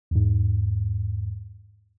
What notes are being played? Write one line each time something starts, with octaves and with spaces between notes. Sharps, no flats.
E2 G#2